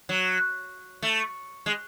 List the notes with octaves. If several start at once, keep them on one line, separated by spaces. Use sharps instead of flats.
F#3
A3
G#3